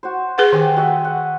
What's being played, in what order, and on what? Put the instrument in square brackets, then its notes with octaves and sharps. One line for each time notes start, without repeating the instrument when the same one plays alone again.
[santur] F#4 C5
[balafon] G#4 B4 F#5
[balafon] D#3 [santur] G4 G#5
[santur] F#4 D#5 E5
F#5